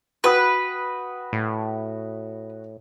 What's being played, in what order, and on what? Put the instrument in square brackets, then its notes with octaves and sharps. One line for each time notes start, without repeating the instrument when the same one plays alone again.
[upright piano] F#4 G5 D#6 [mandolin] B4
[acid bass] A2